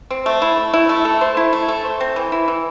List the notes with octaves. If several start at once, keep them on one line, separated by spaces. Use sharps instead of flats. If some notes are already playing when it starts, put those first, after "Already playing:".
C4
A3
E4
A3
E4
A3
A4
C5
E4
A3
A4
C5
C4
E3
E4
E3